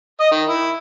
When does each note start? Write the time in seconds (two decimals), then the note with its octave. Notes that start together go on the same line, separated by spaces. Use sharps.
0.20 D#5
0.32 D#3
0.48 E4